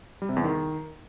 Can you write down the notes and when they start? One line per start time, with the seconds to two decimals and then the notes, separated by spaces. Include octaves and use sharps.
0.22 G3
0.29 C3
0.36 E2
0.44 D#3